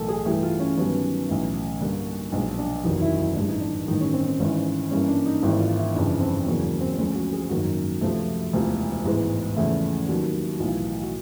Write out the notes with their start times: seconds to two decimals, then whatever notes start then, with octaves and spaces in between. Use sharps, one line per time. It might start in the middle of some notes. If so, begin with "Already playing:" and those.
Already playing: B1 A2 E3 A4 A#4
0.08 G#4
0.25 G2 E3 A3 G4
0.43 F4
0.60 C#4
0.77 G2 D#3 F#3 B3 C#4
1.29 B1 A2 E3
1.81 G2 D3 G3 A#3
2.32 B1 A#2 F3 G#3 D4
2.58 D4
2.84 F#1 E2 C3 D#3 F#3 D#4
3.01 E4
3.19 D#4
3.36 A1 G2 E3 G#3 D4
3.49 D#4
3.61 D4
3.88 A1 G2 D#3 D#4
4.00 C#4
4.13 C4
4.26 C4
4.40 G#1 G#2 E3 C#4
4.91 G2 E3 G3 A#3 C#4
5.08 D4
5.26 D#4
5.42 G#1 G#2 E3 G3 A#3 E4
5.60 F4
5.77 E4
5.94 G1 F2 C#3 E3 D4
6.20 C4
6.46 E1 E2 C#3 F#3 A#3 C#4
6.63 C#4
6.81 C4
6.98 D2 D3 F3 G#3 C#4
7.15 F#4
7.33 G#4
7.49 G#1 F#2 D#3 F#3 A#3 F#4
8.01 C#2 C3 F3 A3
8.53 E1 D2 C3 F4
9.05 A1 G#2 E3 G#3 B3
9.56 E2 C#3 F3 A3 E4
10.08 D#2 D#3 F#3 F#4
10.60 B1 A2 E3 F4
11.03 F#4